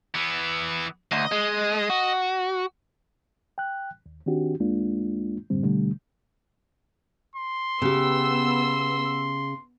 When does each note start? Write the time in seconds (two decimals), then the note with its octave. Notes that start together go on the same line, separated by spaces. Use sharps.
0.15 E3 B3
1.12 D2 D#5
1.32 G#3
1.90 F#4
3.58 G5 F#6
4.06 D#2
4.26 D#3 C4 D4 F#4 G4
4.60 D#2 G#3 A#3 D4 F4
5.50 F#2 A2 D3 G3 C4
5.63 B2 D3 G3 A3
7.35 C6
7.82 C#3 B3 G4 E6